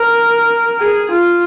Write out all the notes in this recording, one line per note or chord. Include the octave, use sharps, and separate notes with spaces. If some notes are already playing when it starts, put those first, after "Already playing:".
Already playing: A#4
G#4
F4